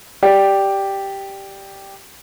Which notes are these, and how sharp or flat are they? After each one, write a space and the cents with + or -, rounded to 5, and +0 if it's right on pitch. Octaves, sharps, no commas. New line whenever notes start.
G4 +0 D5 +0